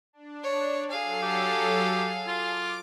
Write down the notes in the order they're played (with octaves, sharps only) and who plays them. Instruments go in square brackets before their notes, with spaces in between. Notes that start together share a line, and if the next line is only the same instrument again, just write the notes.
[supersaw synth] D4
[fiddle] C#5
[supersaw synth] F#3 A4 [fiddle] G#4 F5
[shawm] G4
[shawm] F4 [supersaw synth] D6